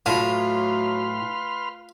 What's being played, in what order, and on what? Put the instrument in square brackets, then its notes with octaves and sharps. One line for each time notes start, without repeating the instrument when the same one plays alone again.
[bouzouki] A2 [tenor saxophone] F#3 [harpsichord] F4 [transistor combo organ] B4 C6 F6